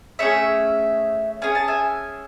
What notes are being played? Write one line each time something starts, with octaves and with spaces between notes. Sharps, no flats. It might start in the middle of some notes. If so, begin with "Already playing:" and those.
A3 C#4 G#4 C#5 E5
C#4 G#4 G#5
A5
E5 G#5